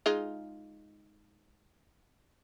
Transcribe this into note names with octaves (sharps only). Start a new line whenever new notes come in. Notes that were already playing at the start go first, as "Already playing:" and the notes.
G#3 D#4 F4